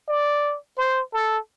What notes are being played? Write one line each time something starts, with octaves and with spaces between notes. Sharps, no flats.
D5
C5
A4